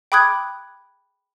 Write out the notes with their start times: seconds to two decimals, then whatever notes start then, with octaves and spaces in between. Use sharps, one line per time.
0.12 G5 B5 D6 D#6 F#6 G#6